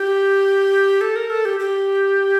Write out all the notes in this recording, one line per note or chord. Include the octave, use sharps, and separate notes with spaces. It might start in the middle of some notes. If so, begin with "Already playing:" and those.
Already playing: G4
A4
A#4
A4
G4
G4